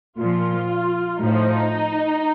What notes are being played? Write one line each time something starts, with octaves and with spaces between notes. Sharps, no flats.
A#2 F3 F4
A2 F3 D#4